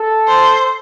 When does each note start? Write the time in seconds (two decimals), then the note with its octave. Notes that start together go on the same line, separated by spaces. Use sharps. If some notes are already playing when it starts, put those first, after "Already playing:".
Already playing: A4
0.28 C5